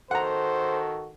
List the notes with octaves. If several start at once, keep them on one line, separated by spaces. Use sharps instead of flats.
D#3 F#4 A4 C5 F#5 A#5